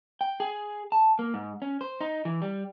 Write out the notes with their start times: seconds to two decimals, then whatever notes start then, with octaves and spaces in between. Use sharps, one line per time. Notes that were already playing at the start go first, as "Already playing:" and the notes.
0.21 G5
0.40 G#4
0.92 A5
1.19 A#3
1.34 G#2
1.62 C#4
1.81 C5
2.01 D#4
2.25 E3
2.42 G3